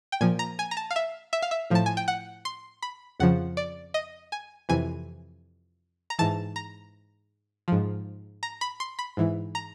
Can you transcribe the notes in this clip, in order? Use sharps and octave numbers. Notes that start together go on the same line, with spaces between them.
G5
A#2 F3 G#5
A#5
G#5
A#5
A5
F5
E5
E5
F5
E5
A2 F3 A5
G#5
G5
F#5
C6
B5
F2 C#3 F3 F#5
D5
D#5
G#5
F2 C3 E3 G#5
A#5
G#2 E3 A5
A#5
G#2 F3
A#5
B5
C6
B5
G#2 E3
A#5